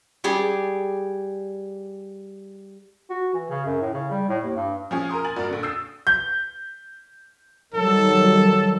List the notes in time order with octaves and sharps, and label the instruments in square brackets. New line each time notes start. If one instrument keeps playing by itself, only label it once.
[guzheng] G3 G4 G#4 D5
[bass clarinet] F#4
E3
C#3
F#2
A2
C#3
G3
A2
D#2
G2
[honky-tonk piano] F3 C#4 G#4
A#4 A#5 C6 D#6
G#5 A6 F#7
G2 F#4 A#4 D5
A#1 D3
D#6 E6 G6 A6 C7
[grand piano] G6
[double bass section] D#3 F#3 G3 [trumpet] A4